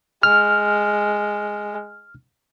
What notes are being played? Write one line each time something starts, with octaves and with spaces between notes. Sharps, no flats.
G#3 F6